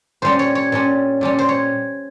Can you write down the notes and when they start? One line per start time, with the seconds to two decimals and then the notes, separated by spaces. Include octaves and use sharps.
0.22 A#2 G3 C#4 C5
0.39 C#5
0.55 C#5
0.72 A#2 G3 C#4
1.21 A#2 G3 C#4
1.39 C5
1.49 C#5